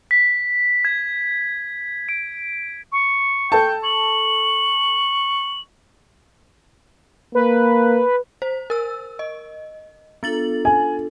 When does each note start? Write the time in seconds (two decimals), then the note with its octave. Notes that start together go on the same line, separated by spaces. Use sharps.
0.11 B6
0.85 G#6
2.09 D7
2.92 C#6
3.52 A4 G5 A5
3.84 C#6 F#7
7.35 A#3 B4
8.42 C5
8.70 A#4 E6
9.19 D#5
10.23 B3 D4 F4 A4 A6 F#7
10.65 G#5